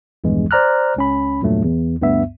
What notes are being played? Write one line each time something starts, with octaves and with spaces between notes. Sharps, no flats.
A#1 E2 G2 E3 G#3
C5 D5 A#5 F6 F#6
C#2 C#4 B5
E2 G2 A#2 F#3 A3
E2
D2 G2 B3 E5